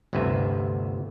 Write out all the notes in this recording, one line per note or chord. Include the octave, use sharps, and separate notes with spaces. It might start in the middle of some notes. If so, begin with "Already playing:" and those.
G1 D2 G2 C3 B4 E5